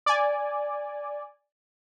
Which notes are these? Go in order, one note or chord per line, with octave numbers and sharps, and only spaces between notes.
D5 G#5